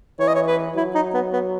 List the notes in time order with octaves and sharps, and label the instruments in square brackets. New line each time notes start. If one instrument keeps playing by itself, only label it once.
[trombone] E3 [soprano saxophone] C#5
[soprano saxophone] D#5
C#5
B4
[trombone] F#3 [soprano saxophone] E4
[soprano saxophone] D#4
B3
B3